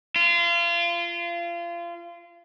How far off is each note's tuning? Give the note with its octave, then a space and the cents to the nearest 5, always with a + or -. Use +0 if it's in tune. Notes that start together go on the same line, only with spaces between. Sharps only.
F4 -30